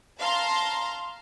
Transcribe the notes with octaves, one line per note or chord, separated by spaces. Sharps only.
F5 A5 A#5 C6